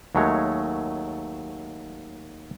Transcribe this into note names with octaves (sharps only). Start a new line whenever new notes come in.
D#2 F#3 G#3 A3 C#5